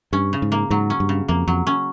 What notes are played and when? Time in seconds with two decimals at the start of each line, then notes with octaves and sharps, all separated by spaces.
0.13 G2 C#4
0.33 C#3
0.42 G#2
0.52 A#3
0.71 G#2 F#3
0.90 C#4
1.00 G2
1.09 C#3
1.28 F2 A#3
1.48 F2 F#3
1.67 C#4